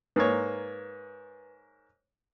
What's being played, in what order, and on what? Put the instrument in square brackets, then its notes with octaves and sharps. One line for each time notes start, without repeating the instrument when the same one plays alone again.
[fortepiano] G#2 A#3 C#5 [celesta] B4